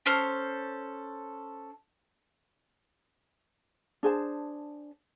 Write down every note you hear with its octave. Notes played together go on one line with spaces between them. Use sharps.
C#4 A4 C5 F6
D4 G#4 C5 A5